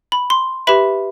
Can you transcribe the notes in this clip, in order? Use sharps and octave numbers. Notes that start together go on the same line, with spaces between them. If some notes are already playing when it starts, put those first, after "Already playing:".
B5
C6
G4 B4 E5 B5